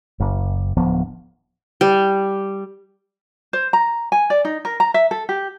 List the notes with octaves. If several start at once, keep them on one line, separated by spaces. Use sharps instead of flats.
F#1
D1 F3 B3
G3
C5
A#5
G#5
D5
D#4
A#4
A#5
E5
A4
G4